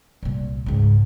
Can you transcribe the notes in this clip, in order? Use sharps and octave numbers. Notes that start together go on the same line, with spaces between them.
C2 A#2
C#2 G#2